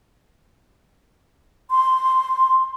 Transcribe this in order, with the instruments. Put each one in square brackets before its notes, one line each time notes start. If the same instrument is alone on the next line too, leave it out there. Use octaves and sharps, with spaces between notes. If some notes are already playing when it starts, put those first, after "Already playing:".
[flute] C6